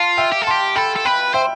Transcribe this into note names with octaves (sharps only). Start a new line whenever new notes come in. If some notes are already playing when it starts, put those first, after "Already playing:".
Already playing: F4 F5 A5
E5 G5
G4
A4
G4 A5 C6
A4 G5 B5
A4
B4 G5 B5
C5 E5 G5